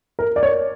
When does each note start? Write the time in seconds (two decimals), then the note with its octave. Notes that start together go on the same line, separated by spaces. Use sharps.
0.19 A#4
0.36 D5
0.43 C#5